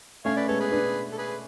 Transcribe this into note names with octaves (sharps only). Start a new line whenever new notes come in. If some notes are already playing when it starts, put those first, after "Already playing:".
A3 C#4 C#5 F5
B4 D5
G#3 B3 A4 C#5
G#4 B4
B3 D4
A4
G#4 B4